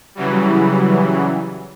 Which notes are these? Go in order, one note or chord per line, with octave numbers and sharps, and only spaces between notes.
C#3 E3 F#3 G3